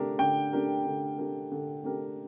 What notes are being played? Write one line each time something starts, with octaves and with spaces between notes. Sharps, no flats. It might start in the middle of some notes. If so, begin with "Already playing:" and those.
Already playing: D3 A3 D4 G4 A#4
D3 G5
A3 D4 G4 A#4
D3
A3 D4 G4 A#4
D3
A3 D4 G4 A#4